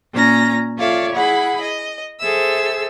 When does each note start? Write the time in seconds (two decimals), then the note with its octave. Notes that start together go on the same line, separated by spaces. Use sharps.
0.13 A#2 C#4 A#5 A#6
0.78 F4 A4 C#5 D5 E5 F5
1.13 E4 G#4 F#5 B5
1.61 D#5
2.20 G#4 A4 C5 E5 E6